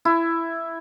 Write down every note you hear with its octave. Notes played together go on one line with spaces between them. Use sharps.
E4